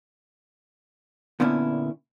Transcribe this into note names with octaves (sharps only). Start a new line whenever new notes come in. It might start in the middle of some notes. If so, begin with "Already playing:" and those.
A#2 D3 B3 C#4 E4